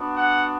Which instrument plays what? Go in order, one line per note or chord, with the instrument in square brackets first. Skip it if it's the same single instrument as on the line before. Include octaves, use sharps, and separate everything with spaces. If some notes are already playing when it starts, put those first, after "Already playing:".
Already playing: [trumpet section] B3 D4 F#4
F#5